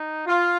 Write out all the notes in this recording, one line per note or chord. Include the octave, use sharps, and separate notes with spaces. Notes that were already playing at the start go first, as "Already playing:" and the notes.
Already playing: D#4
F4